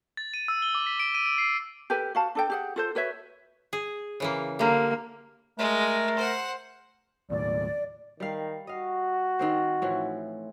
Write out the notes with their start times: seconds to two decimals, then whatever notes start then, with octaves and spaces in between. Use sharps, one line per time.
0.17 A6
0.34 D#7
0.48 E6
0.62 G7
0.75 D6
0.87 B6
1.00 D7
1.15 D#7
1.26 D7
1.38 C7
1.90 G4 A4 B4 G#5
2.15 F#4 F5 A5
2.35 D4 A4 G5
2.50 G4 G#4 F#5
2.76 F4 A4 C5
2.95 F#4 B4 C#5 E5
3.73 G#4
4.20 C#3 E3 A#3
4.59 D3 G3 A#3
5.59 G#3 A3 A#4
6.18 C5 F#5
7.30 D#2 A2 D5
8.20 D#3 G3 F5
8.67 F#4 D#5 F5
9.39 D#3 C4 C5
9.82 A2 E3 F3